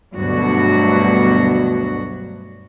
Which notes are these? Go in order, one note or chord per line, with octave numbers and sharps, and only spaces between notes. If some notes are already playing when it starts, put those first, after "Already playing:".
D2 G2 B2 F#3 F#4